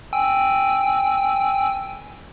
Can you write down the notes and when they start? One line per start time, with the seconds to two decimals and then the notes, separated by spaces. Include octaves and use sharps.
0.13 G5 G#5 E6